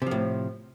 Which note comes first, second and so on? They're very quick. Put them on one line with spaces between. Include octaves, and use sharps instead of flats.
C3 F3 A2